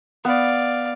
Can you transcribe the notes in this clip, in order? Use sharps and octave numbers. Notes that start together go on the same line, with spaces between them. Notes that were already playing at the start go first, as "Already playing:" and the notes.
B3 D5 F5